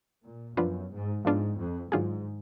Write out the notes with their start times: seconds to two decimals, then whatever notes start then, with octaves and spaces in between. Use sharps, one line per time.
0.24 A#2
0.57 F#2 F3 B3 D4 F4 B4
0.91 G#2
1.25 G#2 F3 G#3 B3 D4 F4
1.58 F2
1.92 G#2 D#3 F#3 D4 F4 G#4